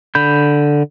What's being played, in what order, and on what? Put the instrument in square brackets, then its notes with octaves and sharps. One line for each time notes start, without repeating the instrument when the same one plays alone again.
[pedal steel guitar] D3 B5 G6